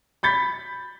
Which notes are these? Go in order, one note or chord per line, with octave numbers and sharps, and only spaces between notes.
B5 G6 A6 B6